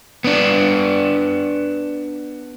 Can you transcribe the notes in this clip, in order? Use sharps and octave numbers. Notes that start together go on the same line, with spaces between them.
B3 D4